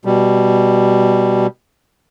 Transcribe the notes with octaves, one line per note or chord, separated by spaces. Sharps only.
B2 G3